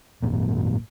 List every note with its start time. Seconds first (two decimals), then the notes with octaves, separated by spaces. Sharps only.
0.22 G#1 F#2 A#2